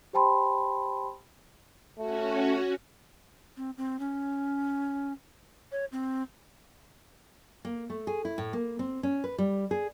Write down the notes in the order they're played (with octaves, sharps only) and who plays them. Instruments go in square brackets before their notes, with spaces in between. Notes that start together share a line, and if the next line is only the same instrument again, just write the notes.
[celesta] G4 C5 G5 A5 B5 C6
[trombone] A3 [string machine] C#4 F#4
[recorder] C4
C4
C#4
C#5
C4
[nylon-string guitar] A#3
A3
G#4
E4
A2
A#3
C4
C#4
B4
G3
G#4